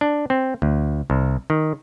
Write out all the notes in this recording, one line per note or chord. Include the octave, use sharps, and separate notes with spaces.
D4
C4
D2
C2
D#3